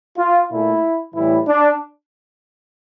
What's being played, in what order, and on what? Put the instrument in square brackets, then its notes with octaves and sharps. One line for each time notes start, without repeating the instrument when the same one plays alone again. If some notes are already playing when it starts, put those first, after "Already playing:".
[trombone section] F4
A#2 A3 E4
A2 E3 G3 E4
D4